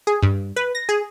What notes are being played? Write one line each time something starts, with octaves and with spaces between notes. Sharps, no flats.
G#4
G2
B4
A#6
G#4